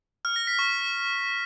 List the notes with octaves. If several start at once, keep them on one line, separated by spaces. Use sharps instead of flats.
F6
A#6
B6
C#6